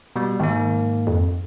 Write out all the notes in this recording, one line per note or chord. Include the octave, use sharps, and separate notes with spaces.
B2 G3
G#2 D#3 A#3
F2